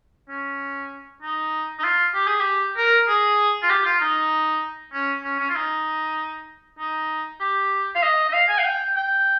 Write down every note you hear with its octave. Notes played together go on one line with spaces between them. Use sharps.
C#4
D#4
D#4
F4
G4
G#4
G4
A#4
G#4
F4
G4
F4
D#4
C#4
C#4
C#4
F4
D#4
D#4
G4
F5
D#5
D#5
F5
G#5
F5
G5
G5